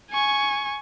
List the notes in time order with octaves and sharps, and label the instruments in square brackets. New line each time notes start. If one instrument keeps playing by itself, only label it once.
[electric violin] G#5 C#6